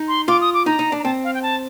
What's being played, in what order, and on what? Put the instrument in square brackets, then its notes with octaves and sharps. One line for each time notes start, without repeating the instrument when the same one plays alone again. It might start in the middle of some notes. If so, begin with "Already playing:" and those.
Already playing: [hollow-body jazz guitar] D#4
[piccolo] C6
[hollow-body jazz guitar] F4 [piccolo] D6
[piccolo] D#6
D6
[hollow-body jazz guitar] D#4 [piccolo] A#5
[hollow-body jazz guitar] D#4
D4
[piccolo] A#5
[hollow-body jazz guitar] C4 [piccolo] A5
[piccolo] F5
G5
A5